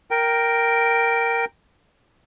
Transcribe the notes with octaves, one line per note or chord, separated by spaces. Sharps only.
A#4 G5